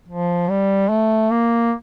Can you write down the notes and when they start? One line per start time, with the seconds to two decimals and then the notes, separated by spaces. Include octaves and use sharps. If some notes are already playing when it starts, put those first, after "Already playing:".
0.09 F3
0.50 G3
0.90 A3
1.31 A#3